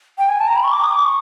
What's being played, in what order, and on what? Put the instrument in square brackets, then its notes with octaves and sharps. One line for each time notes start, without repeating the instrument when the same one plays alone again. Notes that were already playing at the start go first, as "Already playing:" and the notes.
[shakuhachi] G5
G#5
A5
A#5
B5
C#6
D6
D#6
D6
C#6